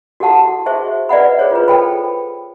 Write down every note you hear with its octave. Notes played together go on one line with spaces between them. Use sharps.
F#4 G4 A4 F#5 A5
F#4 G#4 C5 E5 C#6
B4 D5 E5 F#5 B5
G#4 C5 C#5
F4 B4
A4 G5 B5